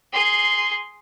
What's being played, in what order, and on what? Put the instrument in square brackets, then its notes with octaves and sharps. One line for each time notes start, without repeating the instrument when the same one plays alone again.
[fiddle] G#4 C6